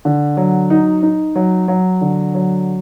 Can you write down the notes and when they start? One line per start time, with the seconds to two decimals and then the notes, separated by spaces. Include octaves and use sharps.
0.05 D3
0.37 F#3
0.70 D#4
1.03 D#4
1.36 F#3
1.68 F#3
2.01 D3
2.35 F#3